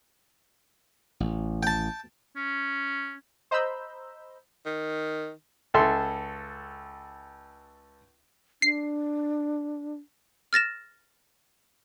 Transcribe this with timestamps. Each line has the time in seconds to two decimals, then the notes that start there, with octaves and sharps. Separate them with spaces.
1.20 A1
1.63 G5 A5
2.36 C#4
3.51 C5 D#5 A#5 B5 E6 G6
4.66 D#3
5.74 C#2 A4 E5 C6
8.62 D4 C7
10.53 F6 A6 A#6 E7